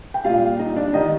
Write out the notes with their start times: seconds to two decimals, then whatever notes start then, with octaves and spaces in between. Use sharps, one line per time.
0.14 G5
0.25 A#2 G3 F4 F5
0.59 D#4 D#5
0.76 D4 D5
0.93 D#3 G3 D#4 D#5